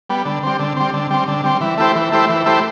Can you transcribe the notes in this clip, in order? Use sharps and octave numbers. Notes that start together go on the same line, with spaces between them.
G3 B3
D3
G3 C4
D3
G3 C4
D3
G3 C4
D3
G3 C4
E3
A3 E4 G4 C5
E3
A3 E4 G4 C5
E3
A3 E4 G4 C5